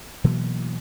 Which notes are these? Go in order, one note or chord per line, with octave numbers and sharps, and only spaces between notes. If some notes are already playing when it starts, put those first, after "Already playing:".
B2 E3 F#3 A#3